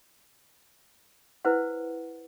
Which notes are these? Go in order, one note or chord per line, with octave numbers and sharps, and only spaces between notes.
E4 B4 C5 F#5